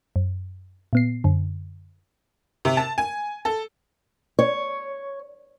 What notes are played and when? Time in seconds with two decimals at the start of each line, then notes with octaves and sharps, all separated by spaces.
0.16 F#2
0.93 A#2 B3 C7
1.24 F#2 D3
2.65 C3
2.77 A5
2.98 G#5
3.45 A4
4.39 C#5